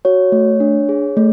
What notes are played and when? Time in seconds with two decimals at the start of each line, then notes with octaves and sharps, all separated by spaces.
0.05 F#4 C#5
0.32 A3
0.60 D4
0.89 G#4
1.17 A3